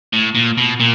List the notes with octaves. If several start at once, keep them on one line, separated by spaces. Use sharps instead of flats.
A2
A#2
B2
A#2